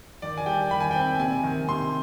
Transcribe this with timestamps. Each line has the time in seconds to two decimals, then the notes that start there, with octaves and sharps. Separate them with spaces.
0.22 D#3 D5
0.37 G#5
0.46 G3 G5
0.71 D#3 B5
0.80 G#5
0.91 C4 G5
1.01 G#5
1.20 C3 G#5
1.43 D#3
1.68 C3 C6